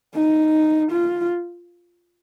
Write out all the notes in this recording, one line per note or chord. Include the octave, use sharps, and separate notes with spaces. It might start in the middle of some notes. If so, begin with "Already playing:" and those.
D#4
F4